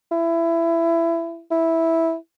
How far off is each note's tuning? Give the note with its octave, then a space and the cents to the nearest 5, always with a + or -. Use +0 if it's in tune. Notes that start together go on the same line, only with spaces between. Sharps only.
E4 +20
E4 -5